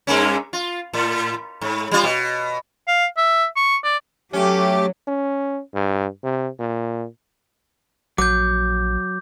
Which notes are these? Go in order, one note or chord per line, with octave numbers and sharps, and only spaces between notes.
G2 A#3 C#4
F4
A2
G#2
G3 F4
B2
F5
E5
C#6
D5
F#3 A3 C#4 G4
C#4
G2
C3
A#2
A#1 F#3 D6 G6